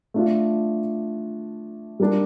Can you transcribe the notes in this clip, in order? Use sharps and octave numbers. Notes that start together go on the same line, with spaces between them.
A3 D4 F4
G3 A#3 D4